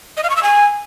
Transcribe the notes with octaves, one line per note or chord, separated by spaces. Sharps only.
D#5
F5
C#6
E6
G#5